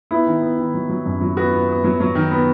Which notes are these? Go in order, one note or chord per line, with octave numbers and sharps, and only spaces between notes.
B3 E4
D#3
B3
D#3
F#3
F#3
F#2
F#3
B3 F#4
B3
B3
F#3
F#3
D#3
B3